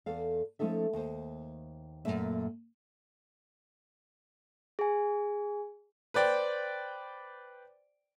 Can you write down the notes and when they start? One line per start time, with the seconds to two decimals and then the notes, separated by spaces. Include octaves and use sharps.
0.06 E2 A4 F5
0.59 F3 A3 C#4 D#4 A4 E5
0.93 D#2 C5
2.05 F#2 A#2 A3 A#3 E5
4.79 G#4 G#5
6.14 B4 C5 D5 G5